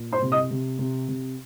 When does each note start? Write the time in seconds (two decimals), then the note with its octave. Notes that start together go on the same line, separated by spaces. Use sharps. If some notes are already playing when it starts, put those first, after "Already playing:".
Already playing: A#2
0.12 C5 C6
0.22 C3
0.32 D#5 D#6
0.51 C3
0.79 C3
1.08 C3